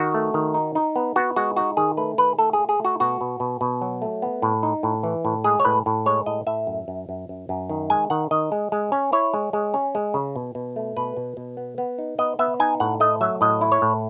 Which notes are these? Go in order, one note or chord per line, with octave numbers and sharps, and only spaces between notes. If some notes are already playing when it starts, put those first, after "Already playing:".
Already playing: D#3 F#4
A3
D#3
D#4
D#4
B3
B3 F#4
G#3 F#4
D#4 F#4
D#3 G#4
A3 B4
D#3 B4
A3 A4
G#4
A3
G#4
A3
F#4
B2 F#4
B2
B2
B2
F#3
A3
B3
A2
D#4
A2
E3
A2
G#3 G#4
C#5
A2 B4
A2
G#3 C#5
A2 D#5
A2 E5
F#2
F#2
F#2
F#2
F#2
D#3
G#3 G#5
D#3 F#5
D#3 D#5
G#3
G#3
C#4
E4 C#5
G#3
G#3
C#4
G#3
C#3
B2
B2
A3
B2 B4
B2
B2
B3
B3
D#4
B3 D#5
B3 E5
D#4 G#5
A2 F#5
A3 D#5
F#3 E5
A2 D#5
E4
C#5
A2